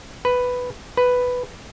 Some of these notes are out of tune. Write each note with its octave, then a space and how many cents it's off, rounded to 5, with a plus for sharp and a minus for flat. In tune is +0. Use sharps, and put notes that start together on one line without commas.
B4 +5
B4 +5